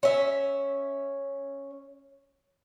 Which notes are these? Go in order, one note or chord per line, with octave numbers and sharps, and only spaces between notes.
C#4 E5